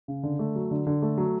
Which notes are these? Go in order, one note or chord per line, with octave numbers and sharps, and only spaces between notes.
C#3
D3
A3
F#3
D3
D3
A3
F#3